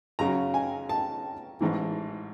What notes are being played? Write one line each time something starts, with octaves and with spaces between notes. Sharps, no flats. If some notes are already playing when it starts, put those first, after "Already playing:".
F#2 C#3 F#3 A#5
G#5
A5
A1 G#2 E3